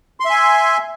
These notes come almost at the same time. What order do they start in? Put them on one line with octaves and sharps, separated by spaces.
C6 E5 G#5